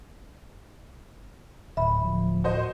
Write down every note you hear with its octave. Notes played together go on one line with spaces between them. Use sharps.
D1 A2 E5 B5
F3
A2 F#4 C5 D#5